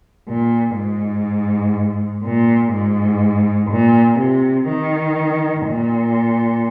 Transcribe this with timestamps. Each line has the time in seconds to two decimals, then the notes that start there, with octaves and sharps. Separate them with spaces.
0.29 A#2
0.77 G#2
2.24 A#2
2.73 G#2
3.71 A#2
4.20 C3
4.68 D#3
5.67 A#2